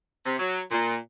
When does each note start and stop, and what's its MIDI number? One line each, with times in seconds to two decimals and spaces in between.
0.25 0.39 48
0.39 0.60 54
0.71 0.97 46